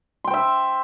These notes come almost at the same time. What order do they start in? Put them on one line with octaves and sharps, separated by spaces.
C6 G5 C5 E5